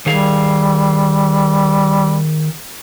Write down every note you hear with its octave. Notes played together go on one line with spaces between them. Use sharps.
D#3 G3 G#4 F5